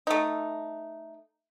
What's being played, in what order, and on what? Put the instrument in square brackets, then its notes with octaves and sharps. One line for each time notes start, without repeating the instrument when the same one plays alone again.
[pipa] A3 D#4